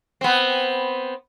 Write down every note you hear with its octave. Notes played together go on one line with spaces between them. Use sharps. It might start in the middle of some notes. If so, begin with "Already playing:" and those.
B3 C4